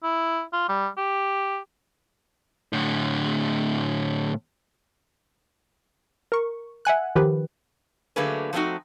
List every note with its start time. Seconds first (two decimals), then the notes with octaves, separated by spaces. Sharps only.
0.03 E4
0.53 F4
0.69 G3
0.97 G4
2.73 A2 D3
6.32 A#4 C#6
6.85 E5 F#5 G#5 F#6
7.16 D#3 F3 G4 B4
8.16 D3 F#3 A3 A#3 G#4 B4
8.53 F3 F#3 A3 C4 D#4 F#4